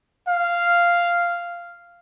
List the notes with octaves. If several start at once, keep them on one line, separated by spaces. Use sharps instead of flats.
F5